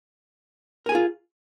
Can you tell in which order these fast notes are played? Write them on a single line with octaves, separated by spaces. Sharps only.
A#4 G#5 G#4 F4